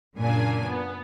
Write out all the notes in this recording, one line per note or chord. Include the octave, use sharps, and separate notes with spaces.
F#2 A#2 C#3 A#3 D4 G#5
B3